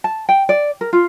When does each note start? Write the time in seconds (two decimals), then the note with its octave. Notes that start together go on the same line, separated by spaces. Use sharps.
0.04 A5
0.29 G5
0.49 D5
0.81 A#4
0.93 F4